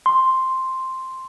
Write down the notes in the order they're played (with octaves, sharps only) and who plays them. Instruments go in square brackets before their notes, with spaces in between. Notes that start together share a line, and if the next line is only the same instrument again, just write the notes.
[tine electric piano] C6